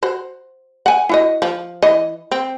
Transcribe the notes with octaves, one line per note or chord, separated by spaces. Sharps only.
F#4 C5
F#5 G#5
E4 F#4 D#5
F3
E3 D#5
C4